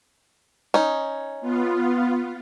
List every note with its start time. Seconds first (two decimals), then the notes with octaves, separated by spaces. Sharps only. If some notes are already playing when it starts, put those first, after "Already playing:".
0.74 C#4 D#4
1.41 B3 F4